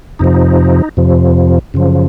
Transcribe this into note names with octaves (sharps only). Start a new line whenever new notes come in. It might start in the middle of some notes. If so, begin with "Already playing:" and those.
F2 C3 F3 D#4
F2 C3 F3
F#2 C#3 F3